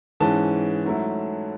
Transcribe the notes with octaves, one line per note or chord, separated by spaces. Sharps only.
G#2 E3 G#3 C#4 A5
G#2 F#3 A3 E4